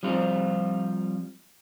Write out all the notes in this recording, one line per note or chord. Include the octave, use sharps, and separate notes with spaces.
F3 G3 C4 F4